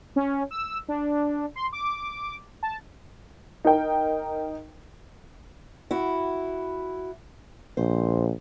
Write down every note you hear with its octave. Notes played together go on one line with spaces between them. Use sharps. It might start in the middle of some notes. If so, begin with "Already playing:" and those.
C#4
E6
D4
C6
D6
A5
D#4 A#4 G5
E4 F#4
A#1 C5